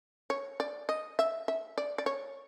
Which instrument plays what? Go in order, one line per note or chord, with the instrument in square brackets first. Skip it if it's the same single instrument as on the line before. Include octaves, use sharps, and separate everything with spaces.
[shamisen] C#5
D5
D#5
E5
E5
D5
D5
C#5